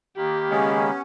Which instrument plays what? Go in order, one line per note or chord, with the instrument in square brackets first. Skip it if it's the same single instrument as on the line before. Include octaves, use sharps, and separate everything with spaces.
[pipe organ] D#3 A#3 B5 [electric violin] G4
[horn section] C#3 G#3 [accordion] B3 C#4